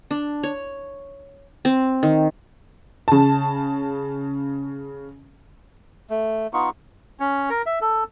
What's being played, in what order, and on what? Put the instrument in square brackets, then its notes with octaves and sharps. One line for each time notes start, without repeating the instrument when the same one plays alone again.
[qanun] D4
C#5
C4
D#3
[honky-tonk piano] C#3 A5
[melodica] A3
B3 D#4 F4 C#6
C#4
A#4
E5
A4